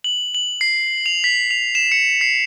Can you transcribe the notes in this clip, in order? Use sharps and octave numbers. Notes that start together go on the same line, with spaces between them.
F#7
F#7
C7
F7
B6
F7
E7
C#7
C7